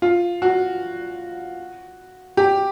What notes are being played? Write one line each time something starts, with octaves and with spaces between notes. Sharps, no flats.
F4
F#4
G4